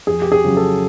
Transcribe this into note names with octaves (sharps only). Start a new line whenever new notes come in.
F2 G#4
G4
G#4
C#3 F#3
A4